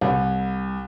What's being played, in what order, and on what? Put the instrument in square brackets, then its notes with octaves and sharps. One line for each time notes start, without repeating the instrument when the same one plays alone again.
[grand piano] C2